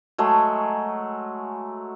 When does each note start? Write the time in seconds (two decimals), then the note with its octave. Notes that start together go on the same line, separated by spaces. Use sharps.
0.18 F#3 G#3 A3 G#4